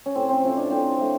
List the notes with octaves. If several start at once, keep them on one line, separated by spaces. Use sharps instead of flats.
C#4
A2 C4
C4
F3 A3 C#4
D4
A2 C4
F3 A3